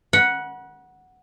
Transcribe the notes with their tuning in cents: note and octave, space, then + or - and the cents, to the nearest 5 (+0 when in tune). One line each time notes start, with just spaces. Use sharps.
F#5 +0 B5 -40